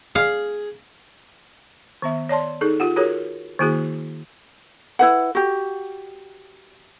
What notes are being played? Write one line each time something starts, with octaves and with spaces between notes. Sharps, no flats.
G#4 F5
D#3 B3 E5
C#5 D5 A5 C6
D#4 G#4 A4
F4 G4 F#5
F4 F#4 G#4 A#4 C#5
D#3 A#3 E4 F#4 G#4
E4 B4 F#5
F#4 G4